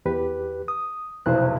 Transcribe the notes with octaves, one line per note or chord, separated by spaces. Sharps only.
E2 G4 B4
D#6
F1 B1 E2 C5 F#6